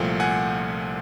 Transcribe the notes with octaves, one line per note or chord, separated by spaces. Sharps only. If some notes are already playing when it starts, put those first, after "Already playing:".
Already playing: C2 A#2 F3 A3 F5 G5
F#5 G#5